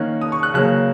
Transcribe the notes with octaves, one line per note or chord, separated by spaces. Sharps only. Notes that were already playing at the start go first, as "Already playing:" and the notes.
Already playing: D#3 A#3 C#4 F#6
D#6
C#6
F#6
C#3 F#3 A#3 C#4 F#6